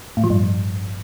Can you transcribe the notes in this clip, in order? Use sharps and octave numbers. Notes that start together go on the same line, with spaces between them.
A2
F3
G2